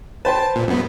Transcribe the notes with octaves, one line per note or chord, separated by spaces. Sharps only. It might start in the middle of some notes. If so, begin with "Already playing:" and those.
B4 C5 G5 A5
A#2
F#2 B3